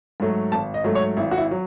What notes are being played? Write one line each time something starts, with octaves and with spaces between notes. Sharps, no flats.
G#2 F#3 A3
G#1 A5
D#5
G#2 F#3 A3
C#5
G#1 E4
F#4
E4
F#3